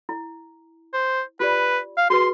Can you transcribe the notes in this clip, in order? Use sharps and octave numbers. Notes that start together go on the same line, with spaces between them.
E4
C5
F4 G4 B4 D5
F5
F#4 G#4 B4 C6